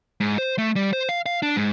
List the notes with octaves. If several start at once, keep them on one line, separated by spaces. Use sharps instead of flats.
G#2
C5
A3
G3
C5
F5
F5
D4
G#2